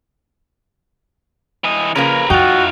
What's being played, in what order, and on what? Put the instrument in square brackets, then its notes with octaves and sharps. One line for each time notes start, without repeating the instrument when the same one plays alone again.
[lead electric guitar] E3 D#5
[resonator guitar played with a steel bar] C#3 F3 A#3 [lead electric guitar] A#4 B4
[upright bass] F2 [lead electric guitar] D#4 F4 [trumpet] F#4 [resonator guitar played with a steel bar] G5